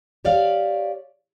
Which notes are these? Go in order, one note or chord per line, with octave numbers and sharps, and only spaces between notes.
G4 C#5 D5 F5